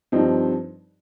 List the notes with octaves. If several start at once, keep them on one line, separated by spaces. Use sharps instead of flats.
G2 F3 C4 D#4